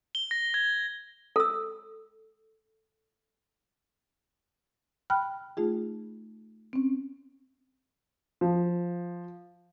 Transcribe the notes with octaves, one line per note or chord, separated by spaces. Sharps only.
G7
A#6
G#6
A4 E6
G5 B5 F6 F#6
A3 D#4 F4 G#4
C4 C#4
F3